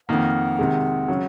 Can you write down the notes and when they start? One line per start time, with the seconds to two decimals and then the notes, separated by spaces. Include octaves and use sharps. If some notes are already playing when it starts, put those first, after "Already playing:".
0.09 F2 D#3 A#3 F#5
0.59 C3 D#3 G#3
1.08 C#3 F#3